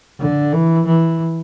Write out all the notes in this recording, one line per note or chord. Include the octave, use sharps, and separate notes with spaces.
D3
E3
E3